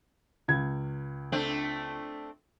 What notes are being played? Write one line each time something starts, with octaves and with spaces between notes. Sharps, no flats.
C#2 G#6
A3 C4 D4